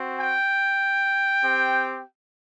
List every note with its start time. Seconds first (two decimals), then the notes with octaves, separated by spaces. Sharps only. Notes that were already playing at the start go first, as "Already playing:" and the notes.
Already playing: C4 F#4
0.19 G5
1.44 C4 G4